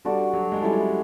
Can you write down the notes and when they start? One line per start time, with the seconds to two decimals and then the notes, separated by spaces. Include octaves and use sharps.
0.05 G3 D4 F#4 A4 D5
0.33 F#3
0.52 G#3
0.61 G3 C#4 E4 A4